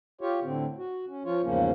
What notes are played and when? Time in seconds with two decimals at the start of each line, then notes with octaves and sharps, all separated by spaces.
0.21 F4 G4 C#5
0.43 A2 D3 C4
0.78 F#4
1.08 C#4
1.25 F3 F4 C#5
1.44 E2 G#2 C#3 F3 A#3 C#4